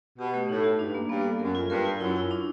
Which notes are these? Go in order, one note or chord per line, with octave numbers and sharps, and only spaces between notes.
B2 G4
A3
A2 D#4
F#4
G2 D4
A#3
G2 B3
A4
F#2 A#4
F4
G2 A#4
F4
F#2 E4
E4
D4